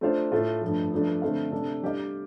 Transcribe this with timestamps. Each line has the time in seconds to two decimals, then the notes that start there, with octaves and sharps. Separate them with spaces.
0.01 A3 D4 F4 C5 F5
0.32 A2 A3 F4
0.62 G2 F3 A3
0.92 G2 F3 A3 D4
1.22 D3 A3 C4 A4 F5
1.52 C3 A3 D4 A4
1.82 G3 D4 G4 D5 F5